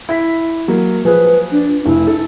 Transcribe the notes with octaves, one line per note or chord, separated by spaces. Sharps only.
E4 B6
F#3 A#3
F3 G#4 B4
D4
F1 E4
A4